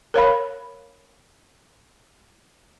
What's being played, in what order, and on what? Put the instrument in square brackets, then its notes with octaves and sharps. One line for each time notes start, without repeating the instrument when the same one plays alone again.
[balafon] A#4 C#5 F5 B5